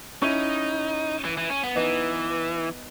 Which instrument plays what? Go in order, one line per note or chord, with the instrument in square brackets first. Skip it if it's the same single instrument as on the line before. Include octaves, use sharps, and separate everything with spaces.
[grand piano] C#4 E4 [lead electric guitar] D#4
[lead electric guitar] E3
E3
C#4
B3
[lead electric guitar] E3 [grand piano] B3 D#4